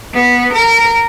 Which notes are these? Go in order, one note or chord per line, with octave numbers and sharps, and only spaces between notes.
B3
A#4